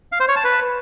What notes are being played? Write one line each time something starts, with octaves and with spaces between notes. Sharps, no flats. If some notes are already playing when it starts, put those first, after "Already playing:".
F5
C5
C#5
A5
B4